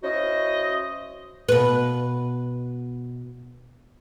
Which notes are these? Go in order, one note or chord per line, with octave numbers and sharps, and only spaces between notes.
C#4 E4 F#4 C5 D#5
B2 B4